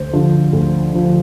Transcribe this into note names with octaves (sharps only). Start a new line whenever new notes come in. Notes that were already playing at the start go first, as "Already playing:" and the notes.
Already playing: D2 C5
D3 F3
D2
D3 F3